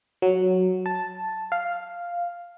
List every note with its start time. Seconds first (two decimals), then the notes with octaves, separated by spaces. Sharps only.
0.22 F#3
0.86 A5
1.52 F5